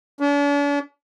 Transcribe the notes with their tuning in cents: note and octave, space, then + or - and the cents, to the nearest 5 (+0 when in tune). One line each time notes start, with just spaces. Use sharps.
D4 -45